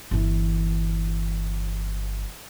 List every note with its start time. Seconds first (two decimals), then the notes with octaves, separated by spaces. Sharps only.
0.11 G1 E3